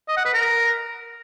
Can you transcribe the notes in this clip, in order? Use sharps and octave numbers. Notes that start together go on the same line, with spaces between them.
D#5
F#5
B4
A#4